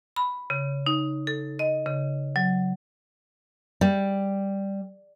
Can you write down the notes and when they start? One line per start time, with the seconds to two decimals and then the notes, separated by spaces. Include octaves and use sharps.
0.16 B5
0.50 C#3
0.87 D#4
1.27 A4
1.59 D#5
1.86 C#3
2.36 F#3
3.81 G3